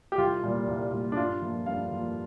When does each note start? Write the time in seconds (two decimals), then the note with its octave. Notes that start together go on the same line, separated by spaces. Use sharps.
0.12 G4
0.18 C2 F4
0.43 A#2 G3
0.68 C2
0.92 A#2 G3
1.12 D4
1.17 G2 F4
1.42 F3 A#3
1.66 G2 F5
1.92 F3 A#3